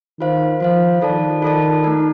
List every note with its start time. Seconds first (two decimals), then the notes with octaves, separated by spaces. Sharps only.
0.20 D#3 F4 C5 F5
0.60 F3 F4 C5 F5
1.01 D#3 F4 A4 D5 A5
1.42 F4 A4 D5 A5
1.84 A3 D#4 A#4